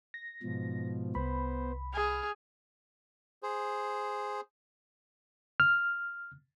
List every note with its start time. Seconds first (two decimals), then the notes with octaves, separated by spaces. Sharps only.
0.14 A#6
0.43 G#2 B2 F3
1.15 C2 B3 C5 B5
1.93 G#4 F6
3.43 G#4 C5
5.60 F6